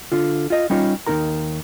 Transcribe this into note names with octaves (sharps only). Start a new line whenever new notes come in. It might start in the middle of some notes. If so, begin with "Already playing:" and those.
D3 F4
F4 D#5
G3 C#4 D#4 F4 C#5
D#2 D#3 D#4 A#4 A#5